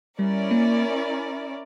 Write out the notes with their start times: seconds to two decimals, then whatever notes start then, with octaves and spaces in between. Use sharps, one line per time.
0.19 G3 C#4 E4 A#4 D5
0.51 A#3